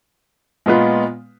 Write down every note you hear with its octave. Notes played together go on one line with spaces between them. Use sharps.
A#2 G#3 B3 F4 B4